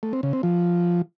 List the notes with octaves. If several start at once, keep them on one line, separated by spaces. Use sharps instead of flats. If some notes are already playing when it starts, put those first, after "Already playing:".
A3
C4
C#3
C4
F3